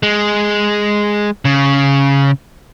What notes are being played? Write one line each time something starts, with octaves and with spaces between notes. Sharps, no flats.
G#3
C#3